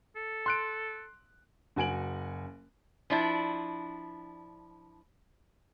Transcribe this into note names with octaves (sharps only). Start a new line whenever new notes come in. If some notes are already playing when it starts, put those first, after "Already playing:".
A4
C6 F#6 D7
F#1 F#4 G#5 D7 F#7
F3 D4 E4